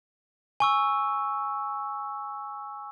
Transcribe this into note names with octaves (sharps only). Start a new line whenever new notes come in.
G#5 C#6 E6